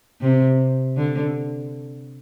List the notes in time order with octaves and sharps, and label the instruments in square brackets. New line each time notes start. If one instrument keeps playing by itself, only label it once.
[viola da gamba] C3
D3